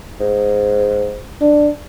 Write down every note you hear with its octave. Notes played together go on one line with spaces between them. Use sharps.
G#2
D4